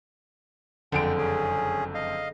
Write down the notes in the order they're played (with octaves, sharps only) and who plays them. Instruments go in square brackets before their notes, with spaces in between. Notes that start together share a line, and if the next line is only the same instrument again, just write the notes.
[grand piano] F#1 F2 D7 [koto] D3 G#3 [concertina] G5
[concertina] C#4 G#4
D#5 F5